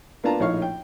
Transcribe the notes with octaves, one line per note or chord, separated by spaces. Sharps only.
A#3 B3 D4 F4 A5 A#5
A#1 A2 D#4 C#5 F5 C#6
G5